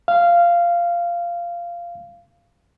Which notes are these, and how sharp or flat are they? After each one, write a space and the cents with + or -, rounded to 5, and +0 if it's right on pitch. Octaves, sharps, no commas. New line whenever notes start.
F5 -10